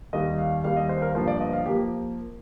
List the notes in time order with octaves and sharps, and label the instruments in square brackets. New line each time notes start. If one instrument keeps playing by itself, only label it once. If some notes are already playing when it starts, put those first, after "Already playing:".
[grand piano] D#2 D#3 G3 D#5
F5
D#2 D#3 G3 F5
D#5
C5
A#4
G1 G2 F3 A#3 C5
D5
D#5
F5
F3 A#3 G4